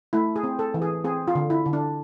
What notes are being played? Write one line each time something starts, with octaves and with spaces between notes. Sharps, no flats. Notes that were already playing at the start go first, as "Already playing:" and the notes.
A3 E4
G#4
C4
A4
E3
G#4
C4 G#4
F4
D3
E4
D3
D4